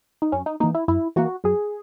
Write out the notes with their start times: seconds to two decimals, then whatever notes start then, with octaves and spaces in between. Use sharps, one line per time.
0.22 D#4
0.32 F#2 C#4
0.46 D#4
0.60 E3 A#3 D#4
0.75 E4
0.88 F#2 E4
1.16 E3 A#3 F#4
1.44 F#2 G#4